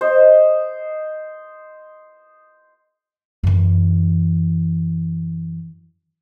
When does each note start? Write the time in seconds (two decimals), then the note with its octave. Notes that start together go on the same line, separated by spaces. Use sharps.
0.01 C5 D#5
3.43 F#2 E3